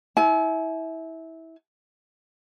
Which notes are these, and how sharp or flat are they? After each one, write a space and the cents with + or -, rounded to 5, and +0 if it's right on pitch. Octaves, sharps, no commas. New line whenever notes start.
E4 -20 G#5 +40